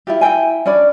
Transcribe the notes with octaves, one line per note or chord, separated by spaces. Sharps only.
E4 F4 G4
E4 E5 G5 G#5
C#4 D4 D5 B5